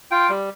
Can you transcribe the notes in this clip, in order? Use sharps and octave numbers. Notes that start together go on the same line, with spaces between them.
F4 G5
G3